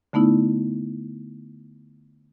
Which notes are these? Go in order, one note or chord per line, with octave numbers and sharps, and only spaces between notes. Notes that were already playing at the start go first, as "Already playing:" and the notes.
D3 A3 B3 D#4 E4